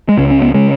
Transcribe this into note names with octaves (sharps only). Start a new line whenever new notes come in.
G#3
C#2 C#3 C#4
C#4
B3
C#3 G#3